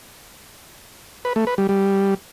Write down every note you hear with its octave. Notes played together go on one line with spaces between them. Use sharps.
B4
A3
B4
G3
G3